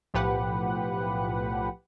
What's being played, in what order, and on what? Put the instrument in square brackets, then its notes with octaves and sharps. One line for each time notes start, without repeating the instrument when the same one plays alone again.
[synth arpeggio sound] B1 A2 F3 G4 B4 F#5